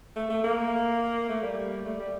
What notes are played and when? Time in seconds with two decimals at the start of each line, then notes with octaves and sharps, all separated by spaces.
0.16 A3
0.30 A3
0.44 A#3
1.29 A3
1.43 G3
1.85 A3
2.00 G3